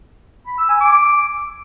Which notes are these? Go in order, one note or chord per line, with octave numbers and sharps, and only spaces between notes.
B5
E6
G#5
D6